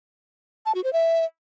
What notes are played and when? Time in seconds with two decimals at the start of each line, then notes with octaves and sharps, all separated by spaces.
0.66 A5
0.75 F#4
0.84 C5
0.93 E5